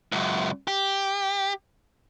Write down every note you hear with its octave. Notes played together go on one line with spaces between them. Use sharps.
C#2 F#2
G4